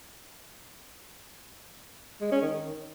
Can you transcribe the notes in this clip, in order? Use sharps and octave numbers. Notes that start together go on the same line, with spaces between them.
G#3
C#4
D#3